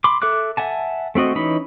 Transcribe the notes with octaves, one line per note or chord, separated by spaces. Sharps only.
B5 C6 D6
A4 E5 D6 F#6
E5 F#5 G#5 A5
A3 C4 F#4 D#5
E3 C#4 D#4 B5